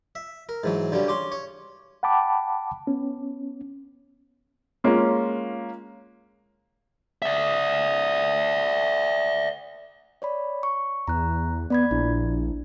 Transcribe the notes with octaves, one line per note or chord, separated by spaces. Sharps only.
E5
A#4
G#2 E3 F#3
G2 D3 F#3 G3 C#4
C#4 C6 D6
C#5
F#5 G5 A5 B5 D6
B3 C#4
G#3 A#3 C#4 F4
D5 E5
C#5 D5 B5
C#6
E2 A#5 F#6
B3 D5 B5 G#6
A#1 D4 E4